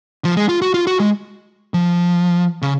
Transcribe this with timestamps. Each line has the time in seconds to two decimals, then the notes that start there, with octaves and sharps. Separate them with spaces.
0.25 F3
0.36 G#3
0.49 F4
0.62 F#4
0.74 F4
0.87 F#4
1.00 G#3
1.74 F3
2.62 C#3